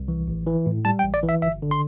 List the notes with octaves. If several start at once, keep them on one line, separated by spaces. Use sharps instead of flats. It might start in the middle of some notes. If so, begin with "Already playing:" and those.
Already playing: C2
E3
A1
E3
A2
G3 A5
G5
A1
D5
E3
E5
G1 E5
D3
C6